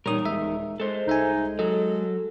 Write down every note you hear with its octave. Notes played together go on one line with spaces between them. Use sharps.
E2 A#2 G3 D#4 A#4 C#5 D#6
D#1 G#3 E5
G#3 A4 C5
C2 D#4 E5 G#5
F#3 A4 D#5